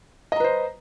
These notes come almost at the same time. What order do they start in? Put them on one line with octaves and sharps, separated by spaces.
D#5 A#5 B4 C5